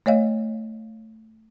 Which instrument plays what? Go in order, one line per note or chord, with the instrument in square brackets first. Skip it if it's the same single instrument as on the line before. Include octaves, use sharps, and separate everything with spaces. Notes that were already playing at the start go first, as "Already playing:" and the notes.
[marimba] A3 C#5 D#5 F5